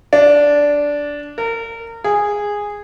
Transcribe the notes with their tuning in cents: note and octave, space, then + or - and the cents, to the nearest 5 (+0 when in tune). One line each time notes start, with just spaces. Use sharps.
D4 -10
A#4 -30
G#4 -10